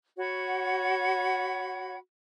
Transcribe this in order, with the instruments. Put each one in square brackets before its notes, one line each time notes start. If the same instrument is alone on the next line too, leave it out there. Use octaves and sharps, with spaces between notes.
[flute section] F#4 C#5 F#5 B5